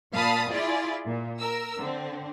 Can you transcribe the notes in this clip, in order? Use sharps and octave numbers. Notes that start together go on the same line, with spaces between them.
A#2 F5 A5 B5 D#6 A6
E4 F4 G#4 D5
A#2
A#4 E6
D3 C4